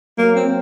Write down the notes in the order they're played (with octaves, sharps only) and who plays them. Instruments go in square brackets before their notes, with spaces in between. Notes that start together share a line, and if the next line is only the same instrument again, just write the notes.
[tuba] F#3 [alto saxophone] A#3
[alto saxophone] C4